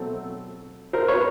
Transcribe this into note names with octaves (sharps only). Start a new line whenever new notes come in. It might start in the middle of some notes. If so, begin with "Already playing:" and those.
Already playing: B2 F#3 A3 C4 A4
A#4 C5
B4 C#5